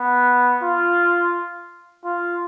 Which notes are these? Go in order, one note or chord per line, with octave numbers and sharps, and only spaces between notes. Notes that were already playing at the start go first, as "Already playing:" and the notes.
Already playing: B3
F4
F4